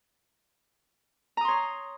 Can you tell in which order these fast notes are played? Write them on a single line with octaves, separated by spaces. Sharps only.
A#5 D#6 C6 C#5